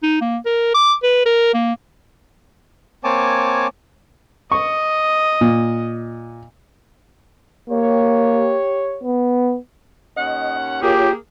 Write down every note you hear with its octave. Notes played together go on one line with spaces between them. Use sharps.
D#4
A#3
A#4
D6
B4
A#4
A#3
A#3 C4 C#5 G#5 A5 D6
D#5 C#6
A#2
A#3 G4 C#5
B3
D#2 C#4 D#5 F#5
A#3 F4 G4 G#4 C#5